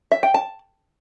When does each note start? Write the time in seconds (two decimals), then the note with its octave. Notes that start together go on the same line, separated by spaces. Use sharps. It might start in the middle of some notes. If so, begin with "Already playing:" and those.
0.12 E5
0.23 G5
0.34 A5